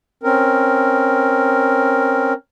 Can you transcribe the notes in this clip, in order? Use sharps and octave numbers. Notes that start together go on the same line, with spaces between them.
C4 C#4 A#4